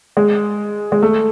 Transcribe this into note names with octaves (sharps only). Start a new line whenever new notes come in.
G#3
G#3
A3